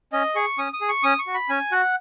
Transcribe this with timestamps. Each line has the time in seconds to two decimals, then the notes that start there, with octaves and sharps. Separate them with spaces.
0.13 C#4 D#5
0.35 G#4 C#6
0.58 C#4 D#6
0.73 D#6
0.81 G#4
0.88 C#6
1.03 C#4 D#6
1.19 C#6
1.27 F#4
1.34 B5
1.49 C#4 G#5
1.72 F#4 F#5